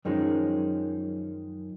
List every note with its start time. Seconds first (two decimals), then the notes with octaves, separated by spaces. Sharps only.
0.05 F#2 D#3 F3 G#3 C#4